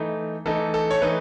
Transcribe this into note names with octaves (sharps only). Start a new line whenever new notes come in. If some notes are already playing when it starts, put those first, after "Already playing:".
Already playing: E3 A3 D#4
E3 A3 D#4 A4
A4
C#5
E3 A3 D#4 B4